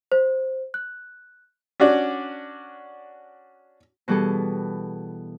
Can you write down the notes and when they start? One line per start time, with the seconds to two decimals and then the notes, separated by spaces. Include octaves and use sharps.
0.12 C5
0.74 F#6
1.80 C#4 D4 F#4 D5
4.08 B2 E3 G3 B3 G#4 A4